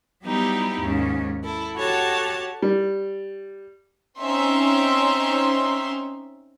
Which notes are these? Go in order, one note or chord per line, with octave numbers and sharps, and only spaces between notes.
F#3 G3 B3 D#4 E4 G4
D#2 G#2 C#4
E4 A4
F#4 G4 A4 C#5 F#5 A5
G3
C4 C#4 D#4 E5 C6